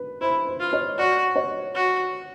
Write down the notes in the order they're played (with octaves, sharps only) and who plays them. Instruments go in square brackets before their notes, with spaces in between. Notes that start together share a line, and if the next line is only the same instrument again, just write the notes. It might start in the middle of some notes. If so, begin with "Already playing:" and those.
Already playing: [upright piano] B4
[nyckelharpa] E4 [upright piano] C5
[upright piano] C5
[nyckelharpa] F4
[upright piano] C#5
[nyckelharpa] F#4 [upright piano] D5
[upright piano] C#5
[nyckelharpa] F#4